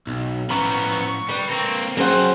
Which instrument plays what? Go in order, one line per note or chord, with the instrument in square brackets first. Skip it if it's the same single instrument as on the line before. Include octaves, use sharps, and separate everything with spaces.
[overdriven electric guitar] B1
[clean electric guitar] A2 C#4 A#5 [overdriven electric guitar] F3 B3 [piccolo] C#6
[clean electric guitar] D3 B4 [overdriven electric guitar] G3
[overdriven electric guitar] A#3 C4
[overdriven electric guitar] F#3 G5 [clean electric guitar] C#4 C#5 [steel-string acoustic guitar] G#4 C5 F#5